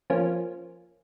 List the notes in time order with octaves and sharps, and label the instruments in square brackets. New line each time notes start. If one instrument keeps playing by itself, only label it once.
[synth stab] F3 A#3 C#4